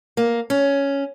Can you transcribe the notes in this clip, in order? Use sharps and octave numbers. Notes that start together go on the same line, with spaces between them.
A#3
C#4